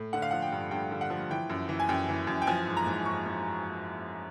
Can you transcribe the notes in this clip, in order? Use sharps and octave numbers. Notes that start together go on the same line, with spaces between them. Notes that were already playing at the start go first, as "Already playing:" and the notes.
Already playing: A2
D3 F#5
F5
F3 F#5
G5
G2
G2 G5
D3
F#5
F3
E3 G5
F#2
E3
G#5
F#2 G5
E3
F#2
G5
F3 G#5
G#2
A#5
G#2
G#2 C#6
F3